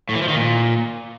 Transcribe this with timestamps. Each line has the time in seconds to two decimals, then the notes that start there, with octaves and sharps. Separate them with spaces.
0.09 A2
0.15 E3
0.22 F3
0.28 D#3
0.34 A#2